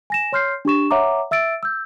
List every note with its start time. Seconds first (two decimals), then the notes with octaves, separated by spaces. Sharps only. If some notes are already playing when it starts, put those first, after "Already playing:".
0.10 G#5 A#6 E7
0.32 C#5 C6 F6 G6 C7
0.65 D4 G4 C#6 E7
0.91 C#5 E5 F#5 A#5 D6
1.31 E5 E6 A6 D7
1.63 E6 G6